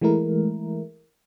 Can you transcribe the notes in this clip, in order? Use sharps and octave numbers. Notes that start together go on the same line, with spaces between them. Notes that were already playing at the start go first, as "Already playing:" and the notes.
E3 G#3 A3 E4 A#4